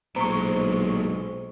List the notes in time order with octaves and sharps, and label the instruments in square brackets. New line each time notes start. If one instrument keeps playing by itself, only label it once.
[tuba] B1 [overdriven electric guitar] A#2 G#3 [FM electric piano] C5 C#6 [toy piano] A#5